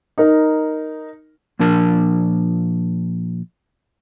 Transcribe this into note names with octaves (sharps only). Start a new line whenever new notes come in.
D#4 A#4
A#2 F3 D4 A#4 A5